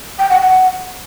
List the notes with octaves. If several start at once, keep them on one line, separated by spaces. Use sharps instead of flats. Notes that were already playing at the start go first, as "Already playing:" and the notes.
G5
F#5
F#5